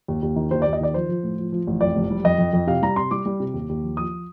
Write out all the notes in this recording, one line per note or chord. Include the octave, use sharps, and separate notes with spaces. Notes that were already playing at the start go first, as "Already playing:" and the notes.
D#2
D#2
D#3
D#2 C5
D#2 D5
D#5
D#3 D5
F3 C5
F3
A2
F3
F3
A1
F2 D5
F1
G3
F2 D#5
F2
F2
C3 F5
G3 A#5
C3 C6
G3 D6
G3
C3
D#2
D#2
F3
F3 D#6